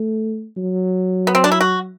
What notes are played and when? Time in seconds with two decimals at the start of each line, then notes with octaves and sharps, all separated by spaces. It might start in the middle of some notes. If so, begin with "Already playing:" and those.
Already playing: A3
0.57 F#3
1.27 B3
1.35 C4
1.44 D4
1.52 E4
1.61 F#4